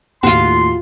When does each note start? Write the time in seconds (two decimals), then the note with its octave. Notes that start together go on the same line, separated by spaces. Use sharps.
0.23 D#2 A2 F4 F#4 C6